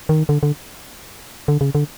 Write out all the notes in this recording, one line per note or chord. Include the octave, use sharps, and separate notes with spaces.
D#3
D3
D3
D3
C#3
D3